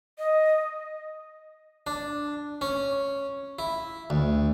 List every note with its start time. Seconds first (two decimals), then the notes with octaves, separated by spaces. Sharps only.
0.18 D#5
1.87 D4
2.61 C#4
3.59 E4
4.10 D2